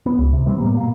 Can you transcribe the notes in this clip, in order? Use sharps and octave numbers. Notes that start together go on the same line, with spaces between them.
B3
C#2
C3
E3 G3 C4
A2 G3 A#3 B3
B2 A#3